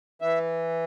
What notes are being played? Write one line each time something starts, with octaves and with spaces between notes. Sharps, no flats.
E3 E5